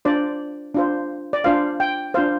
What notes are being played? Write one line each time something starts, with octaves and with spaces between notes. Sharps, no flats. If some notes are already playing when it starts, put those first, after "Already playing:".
D4 F4 C5 D5
D4 F4 C5
D5
D4 F4 C5 F5
G5
D4 F4 C5 F5